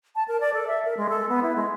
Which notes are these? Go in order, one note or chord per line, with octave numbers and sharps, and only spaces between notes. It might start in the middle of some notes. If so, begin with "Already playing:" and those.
A5
A#4
D5
A4
E5
A#4
G#3
A4
B3
E4
G#3